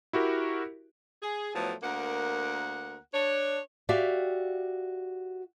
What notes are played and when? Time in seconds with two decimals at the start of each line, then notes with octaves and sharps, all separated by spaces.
0.13 E4 F#4 G4 A#4
1.23 G#4
1.55 A2 F3 F#3 A3 B3
1.83 D2 A#3 A#4 F#5
3.14 D4 C#5
3.89 F#4 G4 D5 E5 F5